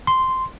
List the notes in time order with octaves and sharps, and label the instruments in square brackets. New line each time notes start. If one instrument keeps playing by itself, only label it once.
[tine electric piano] C6